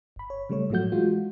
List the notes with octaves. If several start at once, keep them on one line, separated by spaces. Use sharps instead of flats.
G1 B5
C#5
C#3 G3 A3 C#5
A2 F3 F#3 A3 F#4 G6
E3 G#3 F4 F#4